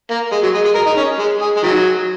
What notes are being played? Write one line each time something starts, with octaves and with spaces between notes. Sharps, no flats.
A#3
G#3
F#3
G#3
G#3
A#4
D#4
C#4
G#3
G#4
G#3
D#3 F#3